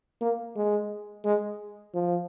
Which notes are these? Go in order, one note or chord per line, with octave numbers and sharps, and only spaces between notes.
A#3
G#3
G#3
F3